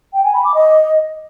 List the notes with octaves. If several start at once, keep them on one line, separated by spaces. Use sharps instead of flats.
G5
G#5
B5
D6
D#5